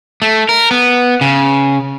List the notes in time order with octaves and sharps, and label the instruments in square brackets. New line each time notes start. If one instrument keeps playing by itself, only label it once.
[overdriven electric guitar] A3
A#4
B3
C#3